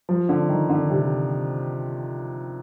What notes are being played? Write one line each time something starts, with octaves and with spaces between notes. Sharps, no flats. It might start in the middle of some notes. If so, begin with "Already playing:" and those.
F3
D3
D#3
D3
C3